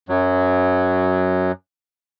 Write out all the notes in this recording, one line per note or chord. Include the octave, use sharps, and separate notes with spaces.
F#2 F#3